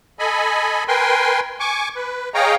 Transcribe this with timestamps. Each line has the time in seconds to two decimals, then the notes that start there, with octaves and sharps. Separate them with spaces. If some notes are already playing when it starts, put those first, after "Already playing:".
0.19 A4 D#5 G#5 B5
0.88 A#4 B4 G5 G#5 C6
1.60 G#5 C#6 D6
1.95 B4
2.34 G#4 C#5 D#5 F5 G5 A#5